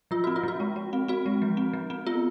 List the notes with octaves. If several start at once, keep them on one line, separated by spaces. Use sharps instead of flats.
F3 F4
C4 F#4
F4
F3 F#4
G#3
G#3
C4
C4 F#4
G#3
F3
C4
F3
C4
B3 F4